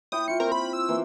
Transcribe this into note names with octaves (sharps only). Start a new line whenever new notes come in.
E4 C#5 G5 D#6
E4 F4 C#7
C4 A#4
B5
E6
E3 A#3